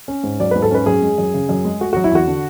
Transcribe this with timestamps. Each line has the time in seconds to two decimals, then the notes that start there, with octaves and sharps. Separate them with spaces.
0.08 C#4
0.24 G#2
0.40 F#3 D5
0.51 G#2 B4
0.62 A4
0.71 C#4 B4
0.86 F#2 G#4
1.02 G#3
1.18 F#2
1.34 C#3
1.49 F#2
1.65 G#3
1.80 A3 F#4
1.93 F#3 F#4
2.04 E4
2.11 E2 F#4
2.27 D3